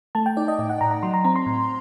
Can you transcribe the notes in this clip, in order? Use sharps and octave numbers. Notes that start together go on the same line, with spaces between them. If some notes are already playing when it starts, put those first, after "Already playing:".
A3 A5
G5
D#4 D5
D#5
A2 D#5
F#5
A2 A#5
A#5
F#3 C6
A#5
C4 A#5
C6
A2